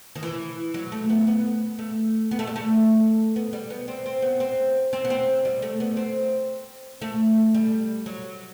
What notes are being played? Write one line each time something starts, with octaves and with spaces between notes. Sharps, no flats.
D#3
E3
F#3
A3
B3
B3
A3
B3
A3
G3
A3
B3
G3
B3
C4
C4
B3
C4
C4
B3
C4
G3
A3
B3
C4
A3
G3
F#3